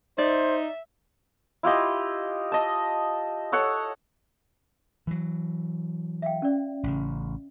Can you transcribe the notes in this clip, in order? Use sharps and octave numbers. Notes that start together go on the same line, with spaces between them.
D#4 C5 D5 E5
E4 F4 G4 D#5
D#5 A5
A4 C#5 F#5
E3 F#3
E5 F5 G5
C#4 D5
A1 C#3